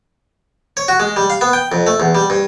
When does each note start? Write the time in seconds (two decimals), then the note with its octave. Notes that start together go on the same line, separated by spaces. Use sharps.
0.77 C#5
0.88 F#4
1.00 G#3
1.16 G3
1.30 F5
1.41 B3
1.53 G5
1.72 F2
1.87 A3
2.00 E2
2.15 G3
2.30 G2